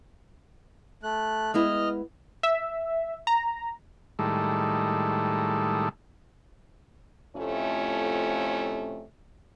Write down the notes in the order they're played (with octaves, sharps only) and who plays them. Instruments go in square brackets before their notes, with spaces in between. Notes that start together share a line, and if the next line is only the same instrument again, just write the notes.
[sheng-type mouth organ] A3 F#6
[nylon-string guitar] G#3 B3 E4 [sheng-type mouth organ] D#5 F6
[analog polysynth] E5
A#5
[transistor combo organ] A2 D#3 G3 G#3 A4
[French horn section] F2 A2 C3 A3 C#4 F4